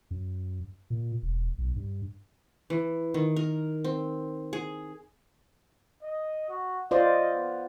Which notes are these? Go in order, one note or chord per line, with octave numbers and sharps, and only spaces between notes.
F#2
A#2
E1
B1
G2
E3
D#3
A#4
C4
G#4
D#5
F#4
F4 C5 D5 D#5
B3